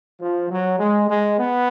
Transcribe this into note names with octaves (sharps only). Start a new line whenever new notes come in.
F3
F#3
G#3
G#3
B3